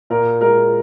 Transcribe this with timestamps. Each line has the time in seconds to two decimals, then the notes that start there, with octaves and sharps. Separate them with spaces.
0.10 A#2 A#4
0.41 G#3 A#4